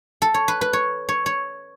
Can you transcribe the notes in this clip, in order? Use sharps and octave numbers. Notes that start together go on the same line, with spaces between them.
A4
C#5
B4
B4
C#5
C#5
C#5